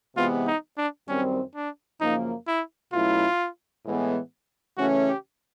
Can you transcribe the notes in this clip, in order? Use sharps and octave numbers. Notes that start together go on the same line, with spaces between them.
C3 E3 G#3 B3 F4
D#4
D4
F#2 D#3 G3 C4 C#4
D4
F#2 C#3 F3 A#3 D#4
E4
B2 F#3 A3 C#4 E4 F4
A2 E3 G#3 B3
C#3 E3 A3 C#4 F#4
G4